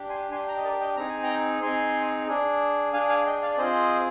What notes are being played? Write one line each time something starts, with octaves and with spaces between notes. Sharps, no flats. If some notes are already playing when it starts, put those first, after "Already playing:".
Already playing: D4 G4
G#5 C6
D4 G4 G#5 C6
G5 A#5
D#5
A#4 D5
D#5 G5
C4 D#4 G#4 A#5
G#5
G5 A#5
C4 D#4 G#4 G#5 C6
D4 G#4
D4 G#4 F5 G#5
F5 G#5
D#5 G5
D5 F5
D5
C4 F4 G#4 C5 D#5